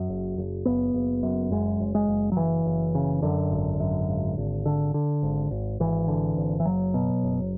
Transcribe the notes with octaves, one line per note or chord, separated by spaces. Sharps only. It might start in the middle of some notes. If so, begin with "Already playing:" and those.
Already playing: F#2
F#1
F#1
F#1 B3
F#1
F#2
F#1 G#3
F#1
G#3
F#1
F#3
F#1 E3
F#1
C#3
F#2 D3
G#1
F#2
G#1
G#1
D3
D3
G#1
G#1
G#1 E3
D3
G#1
E3
F#1 F#3
B2
F#1